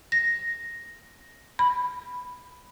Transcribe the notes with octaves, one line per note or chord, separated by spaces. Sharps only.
A#6
B5